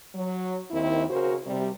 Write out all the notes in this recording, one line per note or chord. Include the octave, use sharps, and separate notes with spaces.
F#3
D#2 D#3 C4 E4
C#3 F#4 A#4 C5
C3 G3